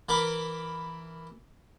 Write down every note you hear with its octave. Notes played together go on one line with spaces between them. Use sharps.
E3 A#4 B5 D6